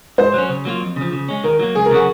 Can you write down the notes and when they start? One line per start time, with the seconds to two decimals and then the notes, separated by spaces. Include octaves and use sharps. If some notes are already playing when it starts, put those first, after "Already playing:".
0.18 G#2 C5
0.34 F#3 C#4
0.49 C#3
0.65 F#3 A#3 F4
0.81 F2
0.96 C#3 F3
1.12 C#3
1.29 G#3 C#4
1.44 D#3 A#4
1.60 F#3 A#3
1.75 C#2 G#4
1.85 A#4
1.91 C#3 F#3 C#4 F#4 G#4